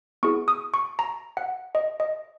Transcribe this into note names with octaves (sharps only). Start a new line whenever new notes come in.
B3 E4 G#4 C#6
D#6
C#6
A#5
F#5
D#5
D#5